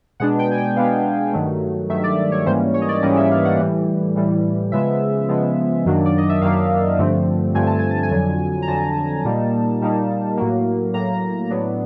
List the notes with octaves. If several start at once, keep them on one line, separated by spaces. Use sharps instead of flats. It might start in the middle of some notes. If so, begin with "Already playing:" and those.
B2 G#3 B3 D4 F#5
G5
G#5
G5
B2 G#3 B3 D4 F5
G2 D#3 F#3 A3
G2 D#3 F#3 A3 E5
D5
C#5
G#2 E3 G3 A#3 C#4 C5
C#5
D#5
D5
G#2 E3 G3 A#3 C#4 D#5
E5
F5
F#5
A2 E3 G3
A2 E3 G3
C#3 F3 G#3 B3 E5
C#3 F3 G#3 B3
F#2 D#3 F#3 A#3 D4
D5
D#5
E5
F#2 D#3 F#3 A#3 D4 F5
G2 D3 F3 A3 C4
G2 D3 F3 A3 C4 G#5
A5
G#5
A5
G#5
F2 D3 F#3
A#5
F2 D3 F#3 A5
A#2 G3 A#3 D#4
A#2 G3 A#3 D#4
A2 F#3 A#3
A2 F#3 A#3 A#5
A2 F#3 B3 D4